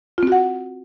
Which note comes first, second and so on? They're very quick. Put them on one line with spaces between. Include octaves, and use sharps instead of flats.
F4 C4 F#4 F#5